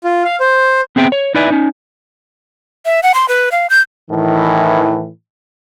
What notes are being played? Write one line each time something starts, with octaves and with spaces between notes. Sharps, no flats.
F4
F5
C5
B3 C4 G#4 E5 G5
C#5
D#4 E4 B4 D5 E5 G#5
C#4 D#4
E5
F#5
C6
B4
F5
G6
A2 D#3 E3